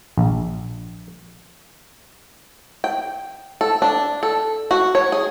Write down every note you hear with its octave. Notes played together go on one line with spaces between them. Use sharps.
A#1
G5
A4
D4
A4
F#4
C#5
G#4